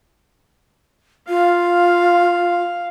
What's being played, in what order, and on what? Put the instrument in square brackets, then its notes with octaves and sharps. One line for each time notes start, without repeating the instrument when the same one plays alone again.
[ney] F4 [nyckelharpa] F5